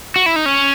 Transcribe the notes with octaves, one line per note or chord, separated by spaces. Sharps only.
F#4
E4
D#4
C#4